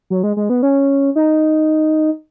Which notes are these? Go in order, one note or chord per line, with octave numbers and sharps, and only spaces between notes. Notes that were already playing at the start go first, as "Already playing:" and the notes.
F#3
G#3
G#3
B3
C#4
D#4